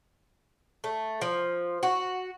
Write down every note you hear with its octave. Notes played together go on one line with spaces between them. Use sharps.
A3
F3
F#4